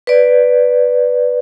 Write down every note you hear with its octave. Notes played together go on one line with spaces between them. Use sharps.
B4 D5